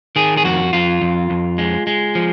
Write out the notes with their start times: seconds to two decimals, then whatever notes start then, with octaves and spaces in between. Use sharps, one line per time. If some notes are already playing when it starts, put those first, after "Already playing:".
0.16 D#3 G#4
0.37 G#4
0.45 F2 F#4
0.73 F2 F4
1.02 F2
1.30 F2
1.58 G#3
1.87 G#3
2.15 F3